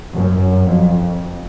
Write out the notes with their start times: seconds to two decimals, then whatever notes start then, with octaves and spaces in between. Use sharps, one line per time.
0.14 F#2
0.67 F2